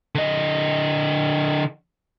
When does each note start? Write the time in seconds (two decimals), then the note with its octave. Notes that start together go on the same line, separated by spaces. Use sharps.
0.15 D3 D#5